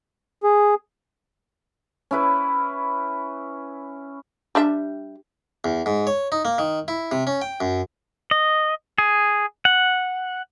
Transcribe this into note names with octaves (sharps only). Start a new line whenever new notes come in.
G#4
C#4 E4 B4
G3 D4 E5
E2
G#2
C#5
D#4
A#3
D#3
E4
C3
C#4
G5
F#2
D#5
G#4
F#5